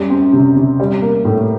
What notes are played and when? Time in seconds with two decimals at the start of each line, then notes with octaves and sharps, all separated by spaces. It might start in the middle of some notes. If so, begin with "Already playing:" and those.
Already playing: F#2 G3
0.10 C4
0.33 C3
0.56 C3
0.80 G3
1.02 A#3
1.25 A2